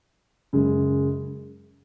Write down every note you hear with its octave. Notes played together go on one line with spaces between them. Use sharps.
F#2 C#3 G#3